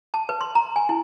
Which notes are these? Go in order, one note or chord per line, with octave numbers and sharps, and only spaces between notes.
A5
B4
C6
A#5
G#5
E4